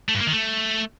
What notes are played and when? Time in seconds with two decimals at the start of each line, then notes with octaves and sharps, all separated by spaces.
0.09 A3
0.15 G2
0.21 A#3
0.27 D#3
0.33 A3